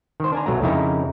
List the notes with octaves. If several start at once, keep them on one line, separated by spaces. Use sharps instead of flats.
D#3 C5
D4 G#5 A#5
B1 F#3 A3 A#5
F2 C#3 D#4 E4 A#4 A#5